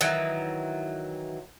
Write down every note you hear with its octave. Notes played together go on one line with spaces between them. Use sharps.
D#3 E3 F#3